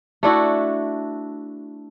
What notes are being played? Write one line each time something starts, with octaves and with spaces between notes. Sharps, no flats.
A3 D4 E4 F#4